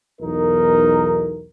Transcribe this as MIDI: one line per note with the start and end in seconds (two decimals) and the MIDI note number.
0.21 1.45 35
0.21 1.45 40
0.21 1.45 63
0.21 1.45 70